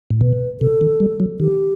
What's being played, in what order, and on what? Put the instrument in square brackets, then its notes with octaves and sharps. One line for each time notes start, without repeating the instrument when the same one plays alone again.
[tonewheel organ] A2
[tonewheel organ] B2 [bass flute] B4
[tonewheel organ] C3 [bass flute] A4
[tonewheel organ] D#3
G3
F#3
[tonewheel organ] D#3 [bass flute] G4